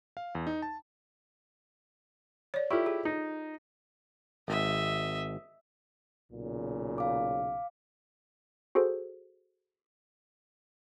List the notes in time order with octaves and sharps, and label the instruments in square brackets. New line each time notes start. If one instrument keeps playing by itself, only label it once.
[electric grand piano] F5
E2
D#4
A5
[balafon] C#5 D5
[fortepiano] E4 G4 [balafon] F4 A4
[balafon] G#4
[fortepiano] D#4
[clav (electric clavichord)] G#1 [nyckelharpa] D#5 E5
[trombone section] B1 A#2 C#3
[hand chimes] F5 D6
[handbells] F#4 G#4 A4 C5